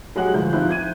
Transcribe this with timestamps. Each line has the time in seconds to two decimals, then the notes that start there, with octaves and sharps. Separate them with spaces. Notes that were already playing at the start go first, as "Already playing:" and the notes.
0.16 F#3 G#3 G4 F#5 F#6 F#7
0.34 D2 F3 E4 G6
0.53 D#3 F3 C4 D#4 E4 F#6
0.69 G6 G#6 D#7